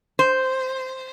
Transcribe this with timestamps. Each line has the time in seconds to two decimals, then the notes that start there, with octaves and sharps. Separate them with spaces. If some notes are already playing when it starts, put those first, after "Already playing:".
0.19 C5